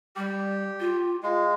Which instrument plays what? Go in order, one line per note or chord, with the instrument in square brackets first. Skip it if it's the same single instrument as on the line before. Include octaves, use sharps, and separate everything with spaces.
[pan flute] G3 [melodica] G4
[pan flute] F4
[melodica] G#3 [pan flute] F5